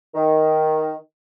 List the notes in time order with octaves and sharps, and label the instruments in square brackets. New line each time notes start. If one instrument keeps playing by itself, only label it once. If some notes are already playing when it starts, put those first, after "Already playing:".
[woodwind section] D#3